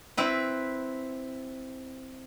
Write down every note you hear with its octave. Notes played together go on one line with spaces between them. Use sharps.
C4 E4 B4